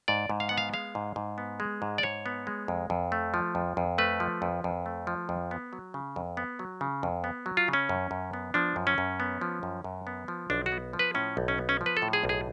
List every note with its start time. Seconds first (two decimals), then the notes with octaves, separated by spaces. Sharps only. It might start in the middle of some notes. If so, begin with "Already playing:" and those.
0.08 G#2 D5
0.30 G#2
0.40 F5
0.49 B3 F#5
0.58 F5
0.73 G#3 F5
0.95 G#2
1.16 G#2
1.38 B3
1.60 G#3
1.82 G#2
1.98 D5
2.03 G#2 C#5
2.26 B3
2.47 G#3
2.68 F2
2.90 F2
3.12 A3
3.34 F3
3.55 F2
3.77 F2
3.98 A3 B4
4.20 F3
4.42 F2
4.64 F2
4.86 A3
5.07 F3
5.29 F2
5.51 B3
5.73 F#3
5.94 C#3
6.16 F2
6.37 B3
6.59 F#3
6.81 C#3
7.03 F2
7.24 B3
7.46 F#3
7.57 F4
7.68 C#3
7.73 C#4
7.89 F#2
8.11 F#2
8.33 B3
8.54 F3 D4
8.76 F#2
8.87 C#4
8.98 F#2
9.20 B3
9.41 F3
9.63 F#2
9.84 F#2
10.07 B3
10.28 F3
10.50 B1 D4
10.66 F#4
10.72 B3
10.93 F3
10.99 B4
11.14 A2 C#4
11.37 B1
11.48 C#4
11.58 B3
11.69 C#4
11.81 F3
11.86 B4
11.97 A4
12.02 A2
12.13 G#4
12.23 B1
12.29 G#4